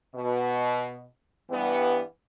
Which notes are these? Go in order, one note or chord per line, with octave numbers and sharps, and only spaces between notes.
B2
G2 E3 G3 B3